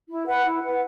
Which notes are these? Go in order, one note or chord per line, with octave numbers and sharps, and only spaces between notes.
E4
B4 F#5
E4
B4 F#5